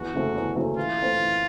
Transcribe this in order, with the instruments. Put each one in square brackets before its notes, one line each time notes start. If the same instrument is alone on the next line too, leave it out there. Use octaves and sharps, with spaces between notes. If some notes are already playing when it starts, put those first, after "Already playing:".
Already playing: [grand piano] E2 [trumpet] F#4
[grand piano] C#3 F#3 A3 C4
E2
C#3 F#3 A3 C4
[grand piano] E3 [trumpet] F4
[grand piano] A3 C4
E3